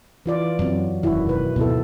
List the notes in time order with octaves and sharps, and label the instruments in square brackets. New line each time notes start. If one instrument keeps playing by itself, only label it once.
[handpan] E3 F4 D5
[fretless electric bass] F#2 C4 [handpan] F#3
[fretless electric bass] E1 F#2 [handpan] D#3 E4 F#4
[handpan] B2 B4
[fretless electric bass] D2 G#2 B2 [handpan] B3 E4 A4